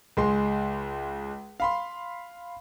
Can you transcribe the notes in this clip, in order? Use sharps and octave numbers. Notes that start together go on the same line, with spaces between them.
C#2 G#3 C6
F5 B5 C6